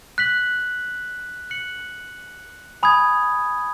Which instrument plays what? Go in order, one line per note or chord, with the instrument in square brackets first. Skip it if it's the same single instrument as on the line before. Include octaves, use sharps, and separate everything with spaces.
[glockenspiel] F#6 B6 F#7
F#6 C#7 F#7
G#5 B5 D#6 G#6